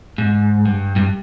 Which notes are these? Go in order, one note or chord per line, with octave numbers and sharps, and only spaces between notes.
G#2
G2
G2